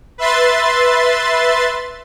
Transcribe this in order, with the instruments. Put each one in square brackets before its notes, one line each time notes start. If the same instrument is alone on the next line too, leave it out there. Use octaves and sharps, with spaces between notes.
[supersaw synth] B4 E5 C6 A6